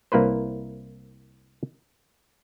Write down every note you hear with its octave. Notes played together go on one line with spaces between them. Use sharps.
C2 A#3 E4 B4 C5